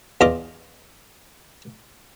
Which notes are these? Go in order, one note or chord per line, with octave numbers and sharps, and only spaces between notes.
E2 F4 D#5 D6